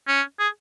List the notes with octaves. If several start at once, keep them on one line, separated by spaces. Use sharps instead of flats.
C#4
G#4